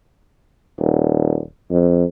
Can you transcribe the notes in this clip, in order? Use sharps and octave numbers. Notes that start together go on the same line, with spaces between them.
D#1
F2